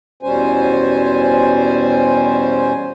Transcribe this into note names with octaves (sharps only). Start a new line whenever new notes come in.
E2 B2 G3 C#4 C5 G#5